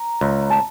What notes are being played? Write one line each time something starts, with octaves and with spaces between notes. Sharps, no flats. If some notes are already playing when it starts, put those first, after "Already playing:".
Already playing: A#5
C#2
A5